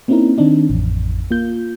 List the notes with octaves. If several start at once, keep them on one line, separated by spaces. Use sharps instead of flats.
A#3 C4 C#4 D#4 E4 A#4
D#3 C4 D4 D#4
A1 F2
A#3 F4 G6